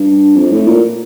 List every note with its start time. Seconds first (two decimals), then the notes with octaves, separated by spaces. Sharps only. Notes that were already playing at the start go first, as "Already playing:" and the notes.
Already playing: G2
0.36 F2
0.52 A2
0.67 A#2